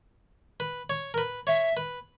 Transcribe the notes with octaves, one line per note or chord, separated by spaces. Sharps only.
B4
C#5
A#4
B4
C#5 E5
B4